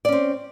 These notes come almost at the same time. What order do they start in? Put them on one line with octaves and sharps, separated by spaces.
D5 C#4 C4